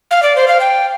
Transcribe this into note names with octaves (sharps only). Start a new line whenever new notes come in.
F5
D5
C5
F5
G5